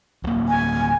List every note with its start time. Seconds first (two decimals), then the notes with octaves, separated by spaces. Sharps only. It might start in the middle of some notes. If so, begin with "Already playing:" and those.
0.24 D1 A#3
0.48 G#5